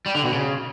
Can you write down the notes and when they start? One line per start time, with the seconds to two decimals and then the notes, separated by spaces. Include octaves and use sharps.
0.06 G3
0.15 D3
0.24 B2
0.33 C#3